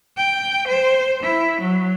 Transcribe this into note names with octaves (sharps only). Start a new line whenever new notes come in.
G5
C5
E4
F#3